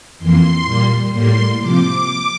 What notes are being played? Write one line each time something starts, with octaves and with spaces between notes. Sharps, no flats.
F2 E3 A#3 C6
A#2 G3 A#3
A2 G3 A#3 C6
C3 F3 D6